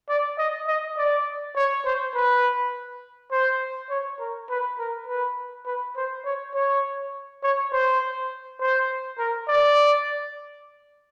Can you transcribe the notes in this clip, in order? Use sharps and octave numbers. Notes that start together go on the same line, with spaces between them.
D5
D#5
D#5
D5
C#5
C5
B4
C5
C#5
A#4
B4
A#4
B4
B4
C5
C#5
C#5
C#5
C5
C5
A#4
D5